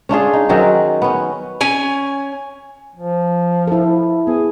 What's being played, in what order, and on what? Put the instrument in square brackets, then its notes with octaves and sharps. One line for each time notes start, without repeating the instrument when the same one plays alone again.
[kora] C#4 D4 F4 G#4
D#4
D#3 F#3 C4 C#4
B3 C#4
[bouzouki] C#4 G#5
[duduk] F3
[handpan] E4 A4
[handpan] B3 [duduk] G#4